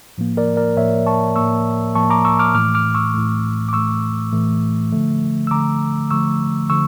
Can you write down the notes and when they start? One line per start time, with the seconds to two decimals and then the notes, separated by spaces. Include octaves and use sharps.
0.18 A2 F3 A#3
0.37 A#4 D5
0.57 A#4 D5
0.77 A2 F3 A#3 C#5 E5
1.07 A5 C#6
1.36 A2 F3 A#3 C#6 E6
1.95 A2 F3 A#3 A5 C#6
2.10 A#5 D6
2.25 C#6 E6
2.39 D6 F6
2.55 A2 E3 A3 D6 F6
2.75 D6 F6
2.95 C#6 E6
3.14 A2 E3 A3
3.69 D6
3.73 A2 E3 A3 C#6 E6
4.33 A2 E3 A3
4.92 D3 F3 A3
5.47 E6
5.51 D3 F3 A3 A#5 D6
6.11 D3 F3 A3 C#6 E6
6.70 D3 F3 C#6 E6